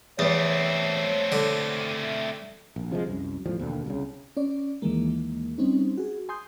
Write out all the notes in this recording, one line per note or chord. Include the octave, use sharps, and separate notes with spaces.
E2 A3 C4 C#5
D3
A#1
C3 F3 G3 G#3
C2 F#2
E2 A2 F3 G3
D#2 B2 D3
C2 C#3
C#4 D5
D#2 D#3 E3 G#3 A#3
G3 C4 C#4 D#4
F#4 G#4
G#5 C6 D#6 G6